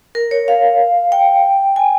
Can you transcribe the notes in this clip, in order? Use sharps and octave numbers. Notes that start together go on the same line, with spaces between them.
A#4
C#5
F5
G5
G#5